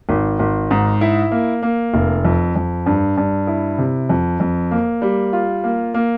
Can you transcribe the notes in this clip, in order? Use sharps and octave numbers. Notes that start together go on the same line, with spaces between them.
G#1
G#1
G#2
E4
A#3
A#3
F1
F2
F2
G2
G2
E4
C3
F2
F2
A#3
G3
F4
A#3
A#3